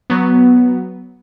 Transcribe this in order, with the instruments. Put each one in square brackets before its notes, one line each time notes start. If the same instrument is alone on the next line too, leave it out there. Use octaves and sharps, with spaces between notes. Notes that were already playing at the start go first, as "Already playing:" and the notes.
[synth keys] F#3 B3